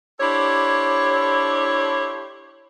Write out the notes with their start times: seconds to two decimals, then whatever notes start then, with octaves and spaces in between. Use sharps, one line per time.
0.20 D4 E4 G4 A4 C5 C#5